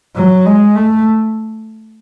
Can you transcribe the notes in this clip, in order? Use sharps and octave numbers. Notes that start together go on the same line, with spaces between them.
F#3
G#3
A3